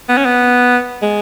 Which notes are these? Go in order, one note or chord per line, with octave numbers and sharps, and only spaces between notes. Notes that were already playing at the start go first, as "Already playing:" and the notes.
B3
C#4
B3
G#3